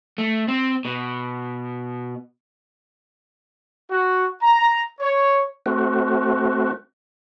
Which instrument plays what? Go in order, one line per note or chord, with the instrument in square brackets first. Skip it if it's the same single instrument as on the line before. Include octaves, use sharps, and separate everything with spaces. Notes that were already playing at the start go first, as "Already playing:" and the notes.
[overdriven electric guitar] A3
C4
B2
[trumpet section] F#4
A#5
C#5
[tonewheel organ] A3 C4 F#4